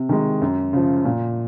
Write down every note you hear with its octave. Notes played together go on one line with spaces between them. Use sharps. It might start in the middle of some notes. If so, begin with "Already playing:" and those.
Already playing: C3
D#3 G#3
F#2
C#3 F3
A#2